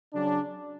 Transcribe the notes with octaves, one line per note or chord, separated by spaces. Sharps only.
C#3 F#3 D4